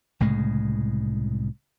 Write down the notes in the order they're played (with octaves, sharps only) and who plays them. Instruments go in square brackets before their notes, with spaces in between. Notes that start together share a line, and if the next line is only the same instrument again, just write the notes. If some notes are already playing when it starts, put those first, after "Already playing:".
[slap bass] C2 A2 C#3 G#3